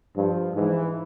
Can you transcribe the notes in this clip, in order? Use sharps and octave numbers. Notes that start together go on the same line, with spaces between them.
G2 F3
G#2 E3